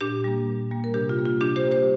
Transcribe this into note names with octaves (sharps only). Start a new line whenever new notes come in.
A#2 D4 G4
G3 A#3
A#2
G3 A#3
A#4
C3 D4 G4
F4
G3 A#3
F4
C3 D4 G4
G4 C5
G3 A#3
G4 C5